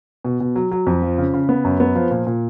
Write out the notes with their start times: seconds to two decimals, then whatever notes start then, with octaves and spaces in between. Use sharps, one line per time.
0.25 B2
0.40 B2
0.56 F#3
0.71 F#3
0.87 F2
1.02 F3
1.18 C#3
1.34 C#3
1.49 B3
1.64 F#2
1.80 B3
1.96 F3
2.11 A#2
2.27 A#2